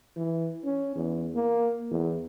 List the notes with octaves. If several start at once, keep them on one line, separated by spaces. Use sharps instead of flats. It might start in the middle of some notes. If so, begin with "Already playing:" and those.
E3
C#4
E2
A#3
E2